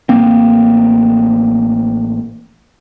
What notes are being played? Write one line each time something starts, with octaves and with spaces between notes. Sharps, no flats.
A1 A#3 C4